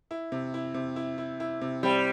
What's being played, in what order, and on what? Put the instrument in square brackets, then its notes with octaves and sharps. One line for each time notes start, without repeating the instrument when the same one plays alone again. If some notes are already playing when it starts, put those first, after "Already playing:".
[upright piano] E4
C3
E4
C3
E4
E4
E4
C3
[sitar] G3 [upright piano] C4